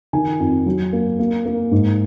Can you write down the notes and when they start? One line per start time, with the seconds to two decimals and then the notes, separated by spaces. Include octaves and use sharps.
0.13 D#3 G#5
0.40 F2
0.66 F#3
0.93 A#3
1.19 A#3
1.46 A#3
1.71 G#2